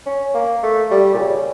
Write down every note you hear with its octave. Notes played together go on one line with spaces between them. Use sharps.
C#4
A#3
A3
G3
A#2
C#3